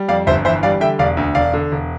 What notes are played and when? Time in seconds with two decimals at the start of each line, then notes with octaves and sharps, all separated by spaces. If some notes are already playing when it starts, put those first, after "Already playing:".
Already playing: G3
0.08 F2 D5 F5
0.27 G1 C5 E5
0.45 E3 C5 E5
0.63 G3 D5 F5
0.81 D3 E5 G5
0.99 E1 D5 F5
1.17 D2
1.35 E1 D5 F5
1.53 D3
1.72 E1